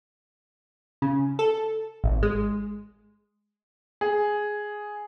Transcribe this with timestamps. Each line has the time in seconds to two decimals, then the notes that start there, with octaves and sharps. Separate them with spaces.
1.02 C#3
1.39 A4
2.04 G#1
2.23 G#3
4.01 G#4